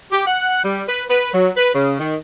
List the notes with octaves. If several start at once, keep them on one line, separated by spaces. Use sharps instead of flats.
G4
F#5
G3
B4
B4
F#3
B4
C#3
D#3